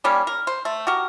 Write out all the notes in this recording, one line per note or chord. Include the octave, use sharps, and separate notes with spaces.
D#3 G3 A#3 C#4
A#4
C5
A3
F#4 G4 A#4